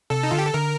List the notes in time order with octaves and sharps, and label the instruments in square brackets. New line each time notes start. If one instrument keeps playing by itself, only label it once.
[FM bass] C3 [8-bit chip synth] A4
[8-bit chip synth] D#4
[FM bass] D3 [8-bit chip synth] F4
[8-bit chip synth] G4
A4
[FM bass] D3 [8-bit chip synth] A#4